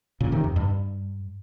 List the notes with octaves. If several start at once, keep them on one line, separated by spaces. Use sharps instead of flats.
A#2 C#3
C3 D#3
F2
G2